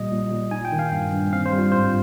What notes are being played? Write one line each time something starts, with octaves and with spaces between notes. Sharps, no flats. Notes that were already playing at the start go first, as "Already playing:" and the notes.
Already playing: A#2 G3 D#5
A#2
A#2
D#4 G#5
G5
D#3
F5
G2
G2
C4 F5
C5
G3
F4
G#2 C5